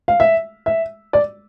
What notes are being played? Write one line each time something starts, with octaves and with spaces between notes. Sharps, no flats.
F5
E5
E5
D5